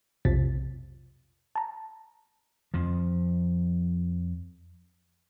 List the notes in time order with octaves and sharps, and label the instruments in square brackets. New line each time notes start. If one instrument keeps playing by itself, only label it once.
[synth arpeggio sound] B1 F2 C3 F3 A6 B6
A5 A#5
[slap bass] F2 F3